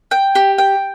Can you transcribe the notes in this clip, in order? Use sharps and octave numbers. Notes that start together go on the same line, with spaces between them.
G5
G4
G5